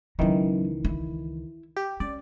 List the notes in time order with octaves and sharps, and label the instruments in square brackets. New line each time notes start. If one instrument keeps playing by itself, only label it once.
[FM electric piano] C#2 D#3 E3 [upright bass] F#3 C#4
[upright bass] E4
[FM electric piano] G4
[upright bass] C#4 [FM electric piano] D5